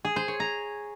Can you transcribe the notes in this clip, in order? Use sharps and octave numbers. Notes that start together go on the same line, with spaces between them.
G#4
C5
C#5
A#5